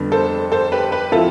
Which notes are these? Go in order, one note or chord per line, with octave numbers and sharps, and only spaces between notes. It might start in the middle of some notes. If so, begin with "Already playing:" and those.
Already playing: F2 D3 G3 B3 D4
A4 C5
A4 C5
G4 B4
G4 B4
F3 C4 E4 F4 A4